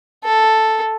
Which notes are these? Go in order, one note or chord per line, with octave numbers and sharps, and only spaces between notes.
A4